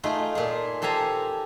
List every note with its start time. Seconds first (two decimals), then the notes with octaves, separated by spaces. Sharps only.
0.03 A3 D#4 F4 G#4
0.35 A#2 G#4
0.82 G4 A4 C5 G#5 A#5